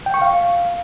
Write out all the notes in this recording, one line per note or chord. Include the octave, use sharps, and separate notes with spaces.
G5
C#6
F5